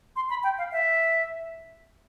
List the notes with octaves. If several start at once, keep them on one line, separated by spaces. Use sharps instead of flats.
C6
B5
G5
F5
E5